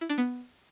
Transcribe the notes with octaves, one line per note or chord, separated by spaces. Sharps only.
E4
D4
B3